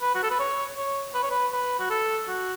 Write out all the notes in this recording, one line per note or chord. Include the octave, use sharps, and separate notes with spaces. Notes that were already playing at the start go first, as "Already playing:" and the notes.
B4
F#4
A4
B4
C#5
C#5
B4
C#5
B4
B4
F#4
A4
F#4